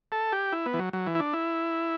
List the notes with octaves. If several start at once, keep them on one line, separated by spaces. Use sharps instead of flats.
A4
G4
E4
B3
E3
F#3
F#3
E3
E4
D4
E4